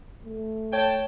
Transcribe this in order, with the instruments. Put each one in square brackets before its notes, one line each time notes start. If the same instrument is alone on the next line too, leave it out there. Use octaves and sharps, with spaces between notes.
[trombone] A3
[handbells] C#5 [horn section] G5 A5